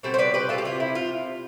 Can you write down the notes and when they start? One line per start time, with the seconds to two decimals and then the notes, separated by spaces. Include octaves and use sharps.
0.03 B2 G3 C4 A4 C5
0.14 C5
0.18 B4 D5
0.34 G4 B4
0.49 F4 A4
0.58 G4
0.65 C3 F3 C4 E4 F4
0.80 E4
0.95 F4